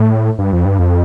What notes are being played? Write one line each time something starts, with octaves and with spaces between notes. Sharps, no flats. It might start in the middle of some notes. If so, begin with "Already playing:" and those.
Already playing: A2
G2
F2
G2
F2